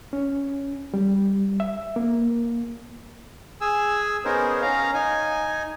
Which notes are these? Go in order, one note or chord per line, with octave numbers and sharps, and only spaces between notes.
C#4
G3
E5
A#3
G#4 G#5 E6
B3 C#4 D#4 G#4 A#4 C5
C#4 F5 A#5
D#4 G#5